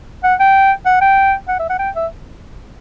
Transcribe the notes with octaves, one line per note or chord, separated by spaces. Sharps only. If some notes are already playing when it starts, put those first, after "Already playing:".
F#5
G5
F#5
G5
F#5
E5
F#5
G5
E5